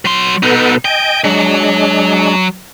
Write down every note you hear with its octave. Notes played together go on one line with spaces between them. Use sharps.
F#3 C6
B2 B3 D#4 A4 B4
D#5 G5 G#5
F#3 G#3 D4